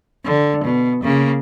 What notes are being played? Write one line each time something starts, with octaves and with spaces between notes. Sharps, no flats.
D3
B2
C#3 A#3